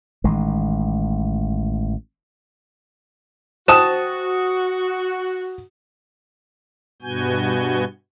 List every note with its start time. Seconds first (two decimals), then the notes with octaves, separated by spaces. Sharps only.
0.24 A1 D#3 G#3
3.68 F#4 C5 G5 A5 D#6 E7
7.02 G2 B2 B3 F#4 G#5 G6